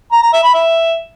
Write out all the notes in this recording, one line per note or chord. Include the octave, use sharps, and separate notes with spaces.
A#5
A#5
E5
B5
E5